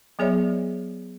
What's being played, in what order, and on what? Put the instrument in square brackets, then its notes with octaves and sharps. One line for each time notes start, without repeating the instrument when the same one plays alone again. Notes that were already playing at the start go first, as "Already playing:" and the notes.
[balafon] F#3 B3 G#4 C#5 D5 E5